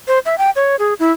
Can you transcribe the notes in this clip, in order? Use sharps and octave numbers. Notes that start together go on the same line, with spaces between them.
C5
E5
G5
C#5
G#4
E4